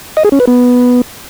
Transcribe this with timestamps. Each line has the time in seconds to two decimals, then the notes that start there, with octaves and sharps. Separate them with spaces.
0.17 D#5
0.24 G#4
0.32 C#4
0.40 B4
0.47 B3